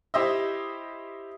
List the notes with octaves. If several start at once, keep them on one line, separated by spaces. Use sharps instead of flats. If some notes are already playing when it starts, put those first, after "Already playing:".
E4 G4 C5 D#5 E5